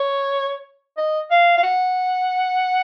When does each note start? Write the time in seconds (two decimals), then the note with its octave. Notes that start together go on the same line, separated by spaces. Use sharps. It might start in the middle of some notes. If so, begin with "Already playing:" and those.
Already playing: C#5
0.97 D#5
1.31 F5
1.58 F5
1.63 F#5